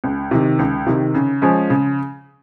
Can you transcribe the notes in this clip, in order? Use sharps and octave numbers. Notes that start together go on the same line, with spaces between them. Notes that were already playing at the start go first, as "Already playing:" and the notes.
C#2
C3 D#3
C#2
C3 D#3
C#3
F3 G#3 C#4
C#3